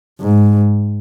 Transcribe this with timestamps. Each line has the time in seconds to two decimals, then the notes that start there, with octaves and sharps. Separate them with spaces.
0.21 G#2